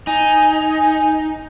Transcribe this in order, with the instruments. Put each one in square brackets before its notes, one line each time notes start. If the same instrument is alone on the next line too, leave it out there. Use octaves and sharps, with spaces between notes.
[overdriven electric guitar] D#4 [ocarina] G#5